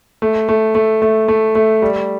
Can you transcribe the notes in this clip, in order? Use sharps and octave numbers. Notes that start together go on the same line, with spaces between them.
A3
A3
A3
A3
A3
A3
G3